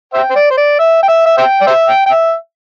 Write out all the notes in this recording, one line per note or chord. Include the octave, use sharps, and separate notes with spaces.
C5 E5 G5
C5
D5
C5
D5
E5
G5
E5
E5
C5 E5 G5
D5
C5 E5
G5
G5
E5